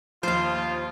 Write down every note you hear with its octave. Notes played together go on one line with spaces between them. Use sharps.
D#2 F3 F4 C5 F5